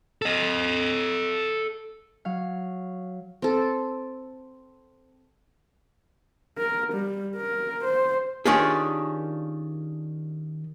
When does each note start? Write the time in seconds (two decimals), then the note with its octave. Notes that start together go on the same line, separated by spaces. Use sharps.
0.22 A4 D#5
2.25 F#3 F5
3.42 C4 A4
6.58 A#4
6.93 G3
7.37 A#4
7.84 C5
8.46 D#3 C#4 D4 F4 G4 G#4